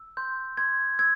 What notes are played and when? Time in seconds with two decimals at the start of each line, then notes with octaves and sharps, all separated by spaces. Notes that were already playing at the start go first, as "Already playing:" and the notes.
Already playing: E6
0.17 C6 G6
0.57 C6 G#6
0.99 E6 G#6